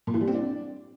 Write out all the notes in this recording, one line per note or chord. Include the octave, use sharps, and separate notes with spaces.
A#2
E3
G3
C4
D4